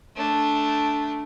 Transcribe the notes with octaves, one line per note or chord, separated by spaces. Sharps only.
A3 D4